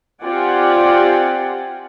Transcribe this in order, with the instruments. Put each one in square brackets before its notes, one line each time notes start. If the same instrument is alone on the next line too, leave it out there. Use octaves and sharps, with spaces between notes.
[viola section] C4 F4 G4 D5 F#5 G#5